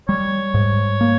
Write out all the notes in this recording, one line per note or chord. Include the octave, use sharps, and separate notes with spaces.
G3 C#5
G#2
A#3